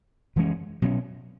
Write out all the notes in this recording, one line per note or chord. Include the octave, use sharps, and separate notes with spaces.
F#2 E3 G#3 C#4
B2 F#3 C#4